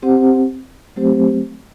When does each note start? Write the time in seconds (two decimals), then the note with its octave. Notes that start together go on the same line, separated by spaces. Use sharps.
0.02 C4 G4 C5 F#5
0.96 F#3 A3 C4 G4 C5